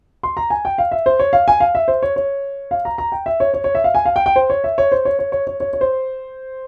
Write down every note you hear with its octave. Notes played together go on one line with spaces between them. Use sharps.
C6
A#5
G#5
G5
F5
E5
C5
C#5
F5
G#5
F5
E5
C5
C#5
C#5
F5
A#5
A#5
G5
E5
C#5
C#5
C#5
E5
F5
G#5
F5
G5
G5
C5
C#5
E5
C#5
C5
C#5
C#5
C#5
C#5
C#5
C#5
C5